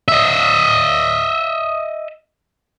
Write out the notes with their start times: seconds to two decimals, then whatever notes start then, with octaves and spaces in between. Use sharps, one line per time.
0.08 D#5 E5